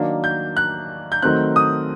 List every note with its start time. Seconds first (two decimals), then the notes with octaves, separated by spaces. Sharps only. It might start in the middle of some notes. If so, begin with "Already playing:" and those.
Already playing: D#3 F#3 A#3 D4
0.24 G6
0.57 F#6
1.12 G6
1.22 D#3 F#3 A3 C4 F#6
1.56 D#6